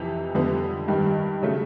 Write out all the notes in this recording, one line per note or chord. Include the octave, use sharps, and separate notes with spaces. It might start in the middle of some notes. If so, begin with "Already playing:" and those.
Already playing: F2 C3 E3
F2 D3 G3 B3
G2 D#3 G3
C#3 F#3 A3